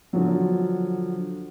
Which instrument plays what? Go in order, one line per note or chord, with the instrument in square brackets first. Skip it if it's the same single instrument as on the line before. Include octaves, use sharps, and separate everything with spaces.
[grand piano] D3 F3 F#3